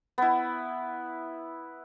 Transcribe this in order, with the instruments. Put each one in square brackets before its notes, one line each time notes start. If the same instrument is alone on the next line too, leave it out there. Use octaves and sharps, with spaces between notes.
[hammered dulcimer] B3 E4